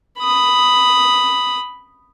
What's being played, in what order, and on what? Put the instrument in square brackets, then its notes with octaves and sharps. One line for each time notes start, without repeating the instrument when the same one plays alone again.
[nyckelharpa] B5 D#6